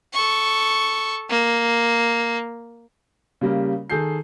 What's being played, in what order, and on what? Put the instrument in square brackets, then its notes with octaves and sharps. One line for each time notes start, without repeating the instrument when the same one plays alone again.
[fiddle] A4 C#6
A#3
[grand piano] C#3 G3 A#3
D#3 G#4 A4 G6 C7